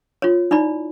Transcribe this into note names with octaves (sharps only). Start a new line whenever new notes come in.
F4 C#5
D#4 E4 D5 B5